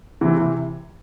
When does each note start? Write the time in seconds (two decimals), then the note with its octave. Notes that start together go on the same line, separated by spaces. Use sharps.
0.21 C3 E3
0.37 C3 E3